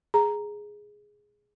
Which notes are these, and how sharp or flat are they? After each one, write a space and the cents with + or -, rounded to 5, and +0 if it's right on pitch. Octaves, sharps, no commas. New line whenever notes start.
G#4 +0 A#5 +0